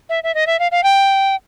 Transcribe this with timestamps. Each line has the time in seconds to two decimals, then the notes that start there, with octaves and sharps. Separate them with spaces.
0.09 E5
0.24 E5
0.35 D#5
0.47 E5
0.59 F5
0.72 F5
0.83 G5